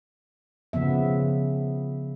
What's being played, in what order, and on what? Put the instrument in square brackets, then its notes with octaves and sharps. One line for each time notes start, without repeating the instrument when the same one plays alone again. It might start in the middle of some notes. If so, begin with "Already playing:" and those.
[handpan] C#3 F3 B3 E5